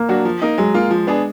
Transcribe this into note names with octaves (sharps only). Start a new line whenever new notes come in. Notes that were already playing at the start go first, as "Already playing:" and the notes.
Already playing: A#3
F#3 D4 F#4
F3
A#3 D#4
F#3 G#3
A#3 F4
F3
B3 D4 G#4